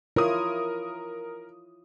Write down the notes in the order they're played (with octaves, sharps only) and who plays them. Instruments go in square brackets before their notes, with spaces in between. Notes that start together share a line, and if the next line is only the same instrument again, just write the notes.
[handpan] E4 F4 C#5 [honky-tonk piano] A#4 D#6